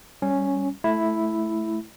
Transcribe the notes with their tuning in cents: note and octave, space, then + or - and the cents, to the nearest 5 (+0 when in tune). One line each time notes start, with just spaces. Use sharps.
G3 +0 C#4 +0
A3 -15 E4 +0